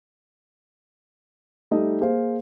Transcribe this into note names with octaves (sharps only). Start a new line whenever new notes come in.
G3 A3 D#4 D#5
A#3 G#4 C5 F5